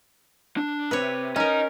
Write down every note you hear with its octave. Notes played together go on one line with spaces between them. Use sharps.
D4
C3 B4 C#5
C#4 A#4 D#5 A#5